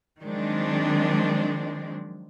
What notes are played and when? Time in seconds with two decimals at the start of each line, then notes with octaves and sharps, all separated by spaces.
0.21 D#3 F3 F#3 G#3 C4 D4